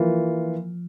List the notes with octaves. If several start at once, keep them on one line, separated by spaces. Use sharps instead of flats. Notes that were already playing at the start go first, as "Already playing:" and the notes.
Already playing: E3 F3 A#3 F4